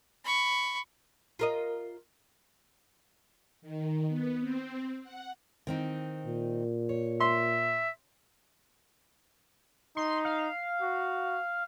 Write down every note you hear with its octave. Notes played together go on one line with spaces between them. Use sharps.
B5 C#6
F4 A#4 D#5
D#3
B3
C4
F#5
D#3 C4 D#4
A#2
C#5
E5 C6
D#4 C6
F5
F#4